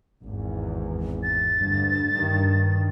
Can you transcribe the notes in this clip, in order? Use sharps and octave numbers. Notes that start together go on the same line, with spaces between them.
G#1 E2
A6
D2 G2
G2 D#3